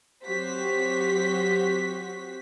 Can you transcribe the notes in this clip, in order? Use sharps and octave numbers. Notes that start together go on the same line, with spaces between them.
F#3 C4 F#4 G4 C5 B6